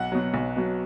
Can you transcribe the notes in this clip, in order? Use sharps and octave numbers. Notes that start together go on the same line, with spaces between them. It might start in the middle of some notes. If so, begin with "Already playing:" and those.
Already playing: B1 F#5
B2 F#3
B1
B2 F#3